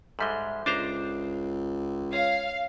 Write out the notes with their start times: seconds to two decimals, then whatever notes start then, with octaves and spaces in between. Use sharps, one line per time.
0.19 G#2 G3 G#3 A4 E5 G7
0.66 C#2 D4 C5 A#5 D6
2.13 C#5 F5